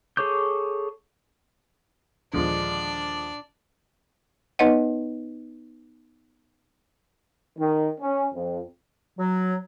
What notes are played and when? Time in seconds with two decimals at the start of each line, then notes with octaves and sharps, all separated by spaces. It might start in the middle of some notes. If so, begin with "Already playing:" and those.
0.17 G#4 A4 C#5 D6 G6
2.33 D#2 A#2 D3 F3 G#3 D4 D5
4.59 B3 D#4 B4 C#5 D#5 F#5
7.59 D#3
8.01 C#4
8.34 F2
9.17 F#3